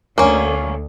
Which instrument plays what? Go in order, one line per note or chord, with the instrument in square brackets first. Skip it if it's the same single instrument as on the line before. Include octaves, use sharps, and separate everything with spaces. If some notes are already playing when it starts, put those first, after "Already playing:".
[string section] D2 [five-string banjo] A#3 C#4